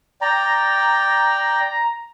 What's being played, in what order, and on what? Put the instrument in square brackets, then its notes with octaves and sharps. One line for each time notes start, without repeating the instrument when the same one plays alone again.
[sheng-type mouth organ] D5 G5 [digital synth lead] A#5